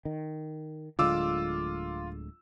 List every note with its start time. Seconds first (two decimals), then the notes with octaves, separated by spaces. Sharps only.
0.05 D#3
0.99 D1 D3 G#3 F4 D6 E6